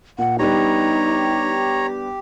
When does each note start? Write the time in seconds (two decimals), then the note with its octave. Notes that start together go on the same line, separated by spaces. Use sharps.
0.19 A#2 F#5
0.39 G3 B3 D4 D#4 G4 C#5 A#5